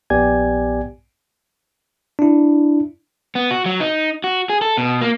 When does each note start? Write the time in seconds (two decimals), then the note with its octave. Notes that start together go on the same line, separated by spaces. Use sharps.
0.10 A#1 B3 G4 D5 G#5 G#6
2.19 D4 E4
3.35 B3
3.51 F#4
3.66 F#3
3.80 D#4
4.24 F#4
4.50 G#4
4.62 A4
4.78 B2
5.01 A#3